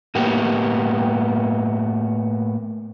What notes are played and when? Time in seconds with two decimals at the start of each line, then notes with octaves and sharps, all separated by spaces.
0.15 A2 A#3 B3 G4